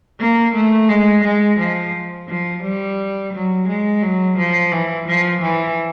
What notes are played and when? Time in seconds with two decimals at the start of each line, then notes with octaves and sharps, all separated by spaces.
0.19 A#3
0.54 A3
0.88 G#3
1.23 G#3
1.59 F3
2.28 F3
2.63 G3
3.33 F#3
3.68 G#3
4.02 F#3
4.37 F3
4.72 E3
5.07 F3
5.41 E3